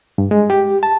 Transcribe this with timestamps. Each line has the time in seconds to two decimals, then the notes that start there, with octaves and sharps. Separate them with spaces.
0.18 G2
0.31 G#3
0.50 G4
0.83 A5